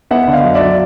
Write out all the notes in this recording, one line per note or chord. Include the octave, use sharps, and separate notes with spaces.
B3 E5 F#5
D3 E5
D#5 F5
F#2
D5 E5
F#3